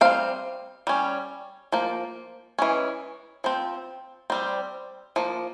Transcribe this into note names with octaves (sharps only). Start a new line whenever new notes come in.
G3 C4 F5
G3 C#4
F3 A#3
E3 G#3 C#4
F3 C4
G3 C4
F3 A#3